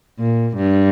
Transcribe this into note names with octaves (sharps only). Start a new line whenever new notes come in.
A#2
G2